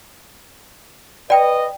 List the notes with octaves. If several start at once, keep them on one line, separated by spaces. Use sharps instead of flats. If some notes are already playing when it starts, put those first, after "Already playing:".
B4 D5 D#5 G5